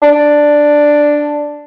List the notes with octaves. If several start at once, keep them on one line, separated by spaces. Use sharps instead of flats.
D4